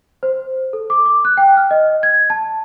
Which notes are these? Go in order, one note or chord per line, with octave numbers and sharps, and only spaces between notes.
C5
A4
D6
D6
F#6
G5
F6
D#5
G#6
A5